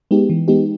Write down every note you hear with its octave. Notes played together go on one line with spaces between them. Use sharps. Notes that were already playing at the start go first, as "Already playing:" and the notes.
G#3 B3 D#4 G4
E3
G#3 B3 D#4 G4